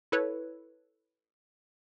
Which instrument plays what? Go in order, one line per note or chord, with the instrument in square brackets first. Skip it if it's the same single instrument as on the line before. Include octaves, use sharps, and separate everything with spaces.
[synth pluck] E4 A4 B4 C#5